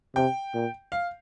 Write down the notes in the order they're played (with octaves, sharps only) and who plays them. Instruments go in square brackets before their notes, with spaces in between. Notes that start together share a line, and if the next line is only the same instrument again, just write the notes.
[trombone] C3 [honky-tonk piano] G5
[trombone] A#2
[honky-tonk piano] F5